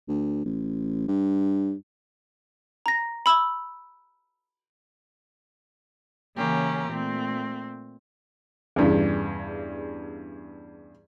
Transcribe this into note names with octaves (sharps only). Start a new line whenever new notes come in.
D2
A1
G2
A#5 A#6
B5 E6
C#3 E3 A#3 C#4 G4 A#5
A#2 A3 C4
E2 G2 C#3